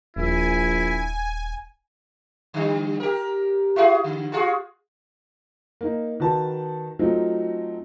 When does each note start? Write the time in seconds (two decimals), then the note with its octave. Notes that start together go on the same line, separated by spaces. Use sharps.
0.16 D#1 A#1 E4 G#5
2.54 D3 G3
3.00 G4 A#4
3.76 E4 F#4 G#4
4.04 D3
4.32 F4 F#4 G#4
5.81 A#3 D#4
6.20 D#3 F#4 B4 A5
6.99 F#3 A3 C4 D#4 F4